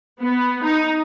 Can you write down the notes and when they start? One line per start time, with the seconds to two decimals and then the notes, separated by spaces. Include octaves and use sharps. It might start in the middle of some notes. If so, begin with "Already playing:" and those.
0.21 B3
0.64 D#4